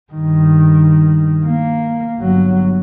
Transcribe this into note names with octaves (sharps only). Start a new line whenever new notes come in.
G2 D#3
A#3
G1 F#3